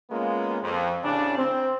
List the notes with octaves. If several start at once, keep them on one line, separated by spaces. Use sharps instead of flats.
G#3 A#3 B3 C#4 F4
F2
A1 C#3 D4
C4